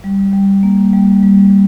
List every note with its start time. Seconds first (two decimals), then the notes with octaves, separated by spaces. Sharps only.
0.04 G3
0.33 G3
0.63 A#3
0.93 G3
1.23 G3